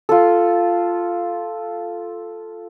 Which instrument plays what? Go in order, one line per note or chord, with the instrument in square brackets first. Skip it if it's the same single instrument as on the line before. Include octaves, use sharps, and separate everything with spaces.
[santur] F4 A4